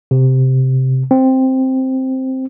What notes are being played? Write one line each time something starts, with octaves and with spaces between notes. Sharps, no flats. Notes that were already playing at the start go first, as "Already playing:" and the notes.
C3
C4